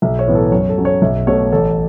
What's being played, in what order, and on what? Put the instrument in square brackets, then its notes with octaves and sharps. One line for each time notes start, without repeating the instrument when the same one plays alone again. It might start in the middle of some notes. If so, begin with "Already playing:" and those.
[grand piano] B1 E5
C#5
A2 E3 B3
A4
F#2 C#5
A4
F#3 C#4
C#5
B1 E5
B2 A3 C#5
A1 A4